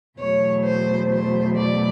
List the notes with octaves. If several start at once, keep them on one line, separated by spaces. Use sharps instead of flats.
E2 B2 F#3 A3 C#5
C5
C5
D5